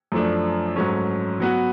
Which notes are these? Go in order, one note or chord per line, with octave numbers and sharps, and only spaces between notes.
F#2 F3 A3 D4
G#2 F#3 A3 C#4
F#3 B3 F#4